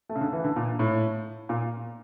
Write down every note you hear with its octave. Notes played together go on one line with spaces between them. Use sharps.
A3
C#3
D3
E3
D3
A#2
A2
A#2